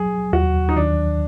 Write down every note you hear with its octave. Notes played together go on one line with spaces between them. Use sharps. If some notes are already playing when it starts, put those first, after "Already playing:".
Already playing: F#3 G#4
D#2 F#4
D#4
D#3 D4